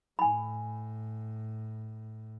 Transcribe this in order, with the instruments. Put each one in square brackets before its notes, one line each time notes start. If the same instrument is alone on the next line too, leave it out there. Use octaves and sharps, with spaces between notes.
[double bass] A2 [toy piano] G#5 B5